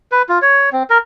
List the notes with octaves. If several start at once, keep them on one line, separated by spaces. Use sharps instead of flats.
B4
F4
C#5
C4
A#4